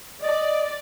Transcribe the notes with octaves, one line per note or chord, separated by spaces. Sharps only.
D5 D#5